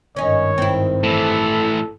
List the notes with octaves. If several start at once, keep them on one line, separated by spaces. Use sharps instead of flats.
G#1 G2 D#3 C#4 D#4 C#5
C4 E4
A2 E3 A4